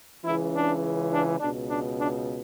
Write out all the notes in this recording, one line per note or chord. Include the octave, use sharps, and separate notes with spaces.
C#2 C#3 E3 E4
D4
D4
C#2 B2 D4
D4
D4